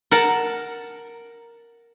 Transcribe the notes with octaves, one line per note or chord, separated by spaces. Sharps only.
A#4 F#5 A5